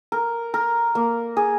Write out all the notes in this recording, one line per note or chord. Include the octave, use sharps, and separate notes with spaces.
A#4
A#4
A#3
G#4